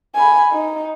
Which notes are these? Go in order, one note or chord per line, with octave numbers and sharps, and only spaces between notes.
G#5 B5
D#4